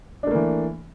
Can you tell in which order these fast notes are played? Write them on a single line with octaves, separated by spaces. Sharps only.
D4 A3 A#3 E3